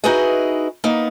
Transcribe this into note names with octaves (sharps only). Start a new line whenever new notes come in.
D#4 E4 F#4 G#4 B4 D#5
A#3 B3 D#4